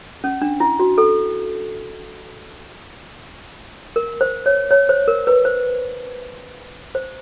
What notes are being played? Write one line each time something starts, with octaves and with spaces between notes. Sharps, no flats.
C#4
D4
E4
F#4
A4
A#4
C5
C#5
C#5
C5
A#4
B4
C5
C5